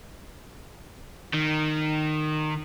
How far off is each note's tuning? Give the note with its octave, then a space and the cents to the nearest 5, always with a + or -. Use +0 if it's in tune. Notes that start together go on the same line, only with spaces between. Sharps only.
D#3 -20